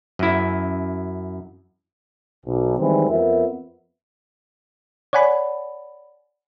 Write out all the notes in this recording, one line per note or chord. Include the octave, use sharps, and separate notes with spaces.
F#2 E4
B1
D#3 E3 G3 G#3 C4
F2 B3 F4 A#4 E5
C#5 D5 F#5 G#5 B5